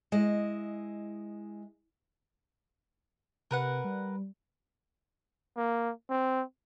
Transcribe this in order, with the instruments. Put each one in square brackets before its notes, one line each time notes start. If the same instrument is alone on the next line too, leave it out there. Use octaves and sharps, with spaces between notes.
[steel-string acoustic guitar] G#3 E4 D#5
[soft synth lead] C3 [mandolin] A#4 B4 F#5
[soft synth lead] G3
[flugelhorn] A#3
C4